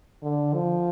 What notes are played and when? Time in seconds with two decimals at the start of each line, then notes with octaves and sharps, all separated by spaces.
0.22 D3
0.53 F3